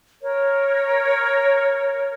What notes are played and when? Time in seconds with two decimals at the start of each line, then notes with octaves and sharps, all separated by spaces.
0.21 A#4 C#5